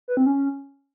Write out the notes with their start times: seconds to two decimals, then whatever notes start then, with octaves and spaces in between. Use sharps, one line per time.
0.08 B4
0.17 C4
0.26 C#4